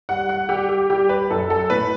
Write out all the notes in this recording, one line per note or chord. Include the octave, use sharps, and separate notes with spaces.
G3 F#5
F#5
G3 G4
G4
G3 G4
B4
F#2 A4
A4
A2 B4